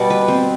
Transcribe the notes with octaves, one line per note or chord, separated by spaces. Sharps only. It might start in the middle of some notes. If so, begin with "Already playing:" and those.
Already playing: B2 G3 B3 D5
B4
C4